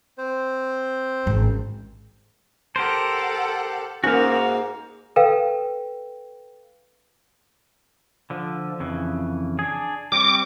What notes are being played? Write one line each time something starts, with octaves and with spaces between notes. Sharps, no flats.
C4 C5
G#1 C#4
G4 A4 A#4 C5 F#5
G#2 A#3 C#4 D#4 F#4 A#4 F5
A4 B4 F5 G5
D3 F3
F2 C#3 E3
D4 G#4
G3 C4 D6